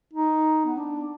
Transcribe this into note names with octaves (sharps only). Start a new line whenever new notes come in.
D#4
B3
D4